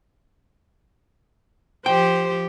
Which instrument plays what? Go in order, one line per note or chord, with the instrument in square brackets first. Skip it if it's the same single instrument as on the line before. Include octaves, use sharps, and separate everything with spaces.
[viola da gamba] F3 G4 [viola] C5 [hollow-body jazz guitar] G5